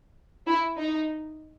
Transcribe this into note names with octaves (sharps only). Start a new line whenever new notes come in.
E4
D#4